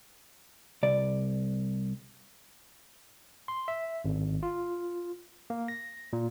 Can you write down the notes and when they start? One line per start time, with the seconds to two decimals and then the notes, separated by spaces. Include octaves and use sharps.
0.83 C2 D5
3.48 C6
3.68 E5
4.05 G#1
4.43 F4
5.50 A#3
5.68 A#6
6.13 A#2